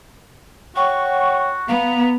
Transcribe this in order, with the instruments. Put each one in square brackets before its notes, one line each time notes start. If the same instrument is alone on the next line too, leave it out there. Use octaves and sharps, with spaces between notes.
[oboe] F#4 [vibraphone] C#5 F#5 G5 [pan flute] C#6
[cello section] B3 [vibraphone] F5 [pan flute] A#5